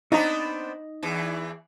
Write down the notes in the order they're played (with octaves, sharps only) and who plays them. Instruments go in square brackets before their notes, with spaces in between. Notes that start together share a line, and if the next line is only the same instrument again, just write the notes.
[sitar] B3 C4 D4 [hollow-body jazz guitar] D#4 D#5 A#5
[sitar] E2 E3